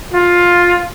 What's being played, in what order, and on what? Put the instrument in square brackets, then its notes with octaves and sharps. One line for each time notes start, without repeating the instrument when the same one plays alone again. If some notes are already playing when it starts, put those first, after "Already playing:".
[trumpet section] F4